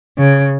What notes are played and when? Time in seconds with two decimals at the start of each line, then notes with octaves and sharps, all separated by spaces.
0.18 C#3